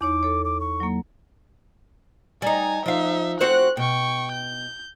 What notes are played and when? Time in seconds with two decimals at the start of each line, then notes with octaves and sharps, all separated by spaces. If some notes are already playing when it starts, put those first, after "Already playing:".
0.01 E2 D#4 C#5 D6
0.23 A4 C#5
0.45 D6
0.60 C#6
0.80 F#3 A#3
2.42 G3 D#4 G#5 A#5
2.86 F3 D#4 E5 F5
3.41 C4 F#4 C5 F#6
3.77 B2 G5 C#6
4.32 G6